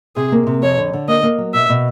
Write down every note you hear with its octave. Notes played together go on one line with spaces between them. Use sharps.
C3 G#4
A#3
C3
F2 C#5
D3
D3
A#3 D#5
A#3
F#3
B2 E5
B2